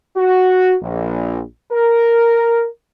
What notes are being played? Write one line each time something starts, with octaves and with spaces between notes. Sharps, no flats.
F#4
A#1
A#4